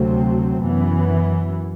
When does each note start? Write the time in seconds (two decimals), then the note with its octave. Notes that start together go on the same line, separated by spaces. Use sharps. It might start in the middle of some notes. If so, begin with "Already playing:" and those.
Already playing: D2 C3 F#3 A3 C4
0.61 F#2 E3 B3